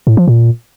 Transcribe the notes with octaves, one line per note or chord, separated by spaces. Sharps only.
A2
F3
A#2